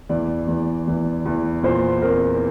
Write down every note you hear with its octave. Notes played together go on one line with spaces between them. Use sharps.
E2 D5
E2
E2
E2
A#2 C5
C4 A#4